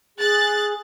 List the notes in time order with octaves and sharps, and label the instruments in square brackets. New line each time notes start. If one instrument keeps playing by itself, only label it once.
[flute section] G#4 [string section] F#6 A6